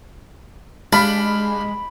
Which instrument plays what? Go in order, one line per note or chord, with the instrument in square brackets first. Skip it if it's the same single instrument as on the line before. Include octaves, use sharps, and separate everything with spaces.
[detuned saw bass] G#3 [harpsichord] D4 G4 F5 [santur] B5